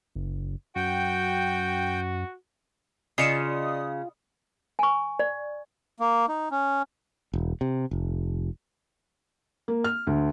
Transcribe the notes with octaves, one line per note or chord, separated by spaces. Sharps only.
F#1
F#2 F#4 G5
C#3 F4 D5 D#5 D#6 C7 C#7 E7
G#5 C#6
D5
A#3
D#4
C#4
E1
C3
F1
A#3
F6
D2